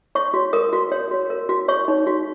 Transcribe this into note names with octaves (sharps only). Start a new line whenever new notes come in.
C#5 C#6
F#4
A#4 D#6
F#4
C#5
F#4
A#4
F#4
C#5 C#6
D#4
F#4